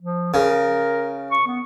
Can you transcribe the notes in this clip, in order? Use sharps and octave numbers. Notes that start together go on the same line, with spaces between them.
F3
C#3 A#4
C#6
B3